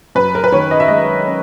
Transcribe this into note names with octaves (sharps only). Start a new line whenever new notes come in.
F#2 B4
A#4
B4
D#3 C#5
D#5
E5
G#3 D#5
C#4